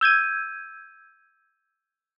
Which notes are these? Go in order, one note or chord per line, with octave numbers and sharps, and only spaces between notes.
E6 G6 G#6 D#7